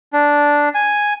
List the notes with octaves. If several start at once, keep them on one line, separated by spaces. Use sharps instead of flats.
D4
G#5